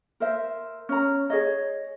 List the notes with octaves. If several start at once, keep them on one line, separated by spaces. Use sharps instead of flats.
A#4 C5 E5
C#4 A#5
G#4 C#5 D#5